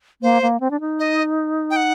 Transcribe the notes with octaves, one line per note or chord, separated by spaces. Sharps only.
A#3 C5
A#3
C4
D4
D#4
D#5
G5
F#5